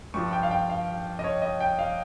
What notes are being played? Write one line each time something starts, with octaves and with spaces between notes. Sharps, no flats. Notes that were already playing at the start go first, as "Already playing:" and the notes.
G2 F3 C#6
G5
F5
G5
F5
D#5
C#5
D#5
G5
F5